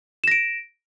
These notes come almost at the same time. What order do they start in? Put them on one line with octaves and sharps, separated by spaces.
E7 A#6 D7